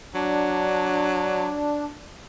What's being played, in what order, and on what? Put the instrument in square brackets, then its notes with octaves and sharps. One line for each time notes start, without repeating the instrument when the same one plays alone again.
[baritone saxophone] F#3 [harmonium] D4